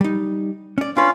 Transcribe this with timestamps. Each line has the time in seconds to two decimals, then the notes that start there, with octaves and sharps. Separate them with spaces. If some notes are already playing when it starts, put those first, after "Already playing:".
0.01 G3 D#4
0.78 C#4 D5
0.97 C#4 D4 F4 B4 F5